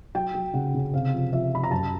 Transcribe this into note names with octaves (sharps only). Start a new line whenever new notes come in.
F#3 G5
F#3
C#3 F#5
C#3
C3 F5
F3
F3 E5
F3 B5
A#5
F#2 A5